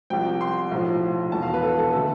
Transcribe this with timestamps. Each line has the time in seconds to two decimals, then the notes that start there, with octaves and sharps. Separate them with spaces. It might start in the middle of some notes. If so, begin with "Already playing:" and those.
0.10 C2 C3 F3 G5
0.41 C6
0.71 B1 A2 F3
1.32 E1 E2 B2 A5
1.42 F5
1.53 B4
1.63 A4
1.79 A4
1.93 D3 A3 A4